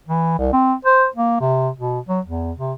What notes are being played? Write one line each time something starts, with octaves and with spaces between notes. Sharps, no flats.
E3
C2
C4
C5
A#3
C3
B2
F#3
E2
C3